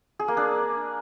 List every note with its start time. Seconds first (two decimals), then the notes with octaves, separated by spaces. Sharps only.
0.19 G#4
0.28 A#3
0.37 D4